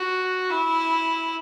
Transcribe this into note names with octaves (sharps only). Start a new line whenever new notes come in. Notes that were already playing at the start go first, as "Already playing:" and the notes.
Already playing: F#4
E4